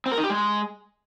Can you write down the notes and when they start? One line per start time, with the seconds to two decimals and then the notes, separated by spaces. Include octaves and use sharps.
0.06 C4
0.12 A#4
0.18 D#4
0.24 G4
0.30 G#3